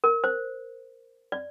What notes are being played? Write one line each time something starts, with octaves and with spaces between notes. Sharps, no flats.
A#4
C5
D5